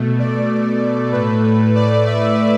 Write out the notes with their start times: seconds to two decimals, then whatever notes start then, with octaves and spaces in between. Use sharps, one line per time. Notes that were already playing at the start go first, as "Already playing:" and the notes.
Already playing: B2 A3
0.19 D5
1.12 A2 A3 B4
1.75 D5
2.06 E5